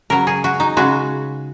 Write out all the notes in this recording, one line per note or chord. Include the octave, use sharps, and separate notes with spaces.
C#3 F#3 A#4
G#4
F#4
D#4
C#3 G#3 F#4